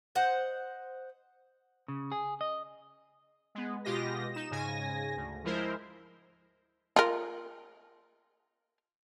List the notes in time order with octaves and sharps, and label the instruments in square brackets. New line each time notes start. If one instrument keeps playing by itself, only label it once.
[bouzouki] C5 D#5 F#5
[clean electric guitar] C#3
G#4
D#5
[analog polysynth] G#3 B3
B2 G#3 F4 G4 D#5 A#6
D#4 E7
G#2 C#3 G#5 A#6
D2
F3 G#3 E4 A#4 C5
[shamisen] F4 A#4